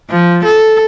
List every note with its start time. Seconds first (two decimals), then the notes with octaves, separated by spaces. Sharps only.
0.10 F3
0.45 A4